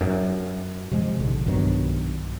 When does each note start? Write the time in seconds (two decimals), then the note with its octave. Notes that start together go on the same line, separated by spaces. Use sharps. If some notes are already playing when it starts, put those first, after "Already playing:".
0.01 F#2
0.91 C3 F3 G#3
1.20 A#1 G#2 D3
1.46 B1 G2 D#3 F#3